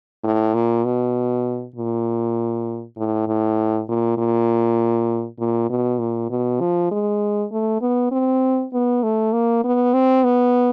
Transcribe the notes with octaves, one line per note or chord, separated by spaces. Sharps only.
A2
A#2
B2
A#2
A2
A2
A#2
A#2
A#2
B2
A#2
B2
F3
G#3
A3
B3
C4
B3
A3
A#3
B3
C4
B3